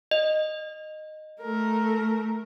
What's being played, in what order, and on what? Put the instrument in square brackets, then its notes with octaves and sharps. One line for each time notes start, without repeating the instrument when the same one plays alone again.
[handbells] D#5
[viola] A3 A#4